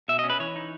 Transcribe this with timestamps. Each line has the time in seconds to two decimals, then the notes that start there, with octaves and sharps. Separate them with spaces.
0.08 B2 E5
0.19 D#5
0.24 C#4
0.30 B4
0.40 E3 C#5
0.56 D#4